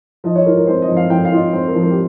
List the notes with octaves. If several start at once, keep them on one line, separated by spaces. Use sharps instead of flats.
F3 D#5
C#5
F4 A#4
A#4
C4 C5
D#5
F3
F5
F3 G5
F5
F4 D#5
C4 C5
A#4
F3
A#4
G4